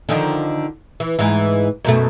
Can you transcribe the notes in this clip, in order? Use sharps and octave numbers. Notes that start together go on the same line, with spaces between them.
D3 D#3 F3
E3
G#2 E3
F#2 B2 A3